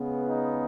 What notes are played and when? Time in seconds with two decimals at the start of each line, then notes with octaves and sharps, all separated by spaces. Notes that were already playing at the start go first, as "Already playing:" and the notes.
Already playing: C#3 G#3 B3
0.24 D#4